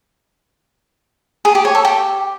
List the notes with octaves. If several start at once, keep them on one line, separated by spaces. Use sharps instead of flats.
G#4
G4
C#5
A4
G4